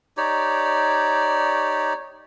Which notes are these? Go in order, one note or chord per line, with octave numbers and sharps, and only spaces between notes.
D#4 G4 C#5 D5